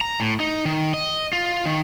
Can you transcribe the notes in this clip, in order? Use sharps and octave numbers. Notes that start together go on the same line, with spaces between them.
A#5
A2
D#4
D#3
D#5
F4
D#3